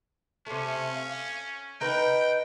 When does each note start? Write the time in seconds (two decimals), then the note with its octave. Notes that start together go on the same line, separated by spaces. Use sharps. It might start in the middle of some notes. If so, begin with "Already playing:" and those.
0.46 C3 A3 C#4
0.94 F5
1.81 D#4 A#4 B4 G5